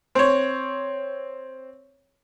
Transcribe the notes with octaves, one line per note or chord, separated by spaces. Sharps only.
C4 C#5